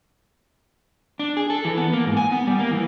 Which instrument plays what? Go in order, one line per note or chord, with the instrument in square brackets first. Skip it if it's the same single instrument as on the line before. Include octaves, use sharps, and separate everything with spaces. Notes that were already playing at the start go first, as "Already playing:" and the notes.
[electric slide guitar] D4
G#4
A4
E3
B3
A#3
G#2
G#5
B3
G3
A#3
E3